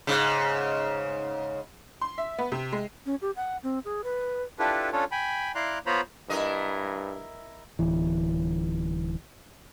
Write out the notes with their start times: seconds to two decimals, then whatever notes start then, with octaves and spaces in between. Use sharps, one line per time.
0.07 G#2 C#3
2.02 C6
2.18 E5
2.39 B3
2.52 C3
2.72 G#3
3.06 C#4
3.22 G4
3.36 F#5
3.63 C4
3.85 G#4
4.04 B4
4.59 D4 E4 F4 G4 A4 B4
4.92 C#4 D4 F4 A4 C#5
5.12 G5 G#5 B5
5.55 E4 D5 F5 A#5 C6 F#6
5.86 B3 F4 C5 C#5 A#5 B5
6.30 G2 E4 A#4 D#5
7.79 D1 E3